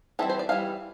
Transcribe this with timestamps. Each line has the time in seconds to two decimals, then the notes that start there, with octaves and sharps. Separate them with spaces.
0.19 E3 G3 C4 E4 A4
0.29 C5
0.39 D5
0.49 E3 G3 C4 E4 F5